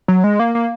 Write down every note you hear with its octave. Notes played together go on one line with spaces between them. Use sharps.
F#3
G#3
A#3
A#3